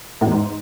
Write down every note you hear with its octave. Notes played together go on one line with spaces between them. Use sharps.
A2
E2
G#2